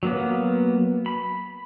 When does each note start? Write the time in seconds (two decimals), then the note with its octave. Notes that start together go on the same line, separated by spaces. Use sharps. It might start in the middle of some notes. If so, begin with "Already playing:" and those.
0.03 F#3 A#3 B3
1.06 B5